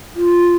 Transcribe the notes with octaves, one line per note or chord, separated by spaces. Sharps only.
F4